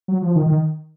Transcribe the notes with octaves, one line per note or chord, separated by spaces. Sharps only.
F#3
F3
D#3
D#3